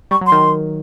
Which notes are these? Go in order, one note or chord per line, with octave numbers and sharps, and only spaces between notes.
G3 C#6
F#3
C6
D#3